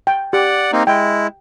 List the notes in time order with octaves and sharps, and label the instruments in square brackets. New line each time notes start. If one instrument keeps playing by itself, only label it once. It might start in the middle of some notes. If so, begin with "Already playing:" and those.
[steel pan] G5
[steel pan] G4 [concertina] D5 F#5
[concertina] A#3 C4 D#4
[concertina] G#3 E4 [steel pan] G5